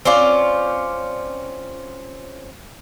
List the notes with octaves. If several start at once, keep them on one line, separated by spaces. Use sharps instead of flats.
C4 C#4 F4 D5